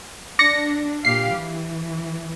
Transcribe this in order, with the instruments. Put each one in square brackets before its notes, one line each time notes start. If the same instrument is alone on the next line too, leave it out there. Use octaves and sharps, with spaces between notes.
[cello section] D4 [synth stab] D5 A#6 C#7
[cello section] A#2 G4 F5 [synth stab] C7
[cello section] E3